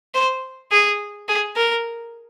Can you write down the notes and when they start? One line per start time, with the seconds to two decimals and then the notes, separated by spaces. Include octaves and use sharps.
0.14 C5
0.71 G#4
1.28 G#4
1.56 A#4